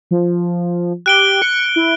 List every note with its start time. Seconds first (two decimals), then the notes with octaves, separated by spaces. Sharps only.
0.11 F3
1.06 G4 F#6 D7 G7
1.42 C#7
1.76 E4